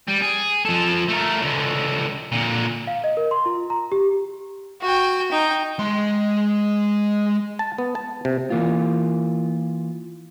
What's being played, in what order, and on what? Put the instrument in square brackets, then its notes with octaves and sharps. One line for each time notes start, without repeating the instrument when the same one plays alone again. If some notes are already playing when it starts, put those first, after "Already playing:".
[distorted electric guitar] G3
G#4
F3 A4
A3 A#4
C#2 D3
A#2 D3
[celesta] F5
D#5
A#4
C6
F4
A#5
G4
[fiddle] F#4 G5
D#4 G5
[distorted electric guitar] G#3 C6
[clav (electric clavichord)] A5
B3
A5
C3
[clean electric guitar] E3 A#3 F4